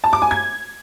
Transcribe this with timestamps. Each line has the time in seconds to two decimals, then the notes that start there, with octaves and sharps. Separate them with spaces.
0.04 A5
0.13 D6
0.22 G#5
0.31 G#6